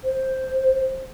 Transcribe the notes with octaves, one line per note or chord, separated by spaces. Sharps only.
C5